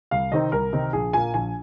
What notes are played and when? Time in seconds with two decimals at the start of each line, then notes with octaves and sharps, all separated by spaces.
0.11 C2 F5
0.32 C3 D#3 C4 D#4 D#5
0.52 C2 A#4
0.73 C3 D#3 C4 D#4
0.93 A#1 G#4
1.13 A#2 A#3 G#5
1.34 A#1 G#5